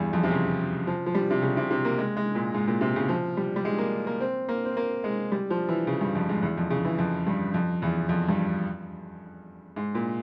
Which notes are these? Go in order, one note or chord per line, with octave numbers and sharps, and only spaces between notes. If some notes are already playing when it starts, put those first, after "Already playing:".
Already playing: E2 G2
F2
C3
C#3
F3
F3
G3
C3
C#3
C3
C3
A#3
G#3
G#3
A#2
G#2
A#2
C3
C#3
F3
G3
G3
G#3
A#3
A#3
C4
A#3
C4
A#3
G#3
G3
F3
E3
C#3
G2
F2
G#2
E2
F2
C#3
E3
F2
G2
F2
E2
F2
G2
G#2
A#2